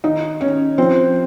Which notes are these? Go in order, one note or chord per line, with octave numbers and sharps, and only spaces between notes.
D#3 D#4 D#5
D#3 C#4 C#5
F3 C4 C5